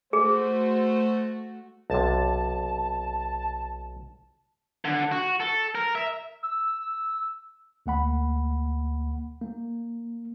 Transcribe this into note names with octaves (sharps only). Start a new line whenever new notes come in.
A3 F#4 G#4 C5
B1 C3 A5
D3
F#4
A4
A#4
E5
E6
D2 A#3 F#5 B5
A#3